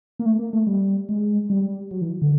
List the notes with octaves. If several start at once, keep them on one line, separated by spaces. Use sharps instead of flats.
A#3
A3
A#3
A3
G3
G#3
G3
F#3
E3
D3